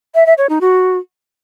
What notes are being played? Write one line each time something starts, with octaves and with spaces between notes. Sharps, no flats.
E5
E5
C#5
D#4
F#4